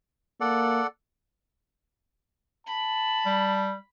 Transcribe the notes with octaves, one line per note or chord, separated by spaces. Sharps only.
A#3 A4 D5 F#5
A5 B5
G3